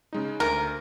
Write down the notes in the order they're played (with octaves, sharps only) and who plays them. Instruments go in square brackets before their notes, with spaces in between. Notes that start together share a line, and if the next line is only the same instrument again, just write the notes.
[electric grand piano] C#3 G#3 D#4
[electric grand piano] D2 [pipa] A#4